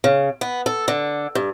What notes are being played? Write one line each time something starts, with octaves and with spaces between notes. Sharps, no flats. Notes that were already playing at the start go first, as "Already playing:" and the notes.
C#3
B3
A4
D3
G2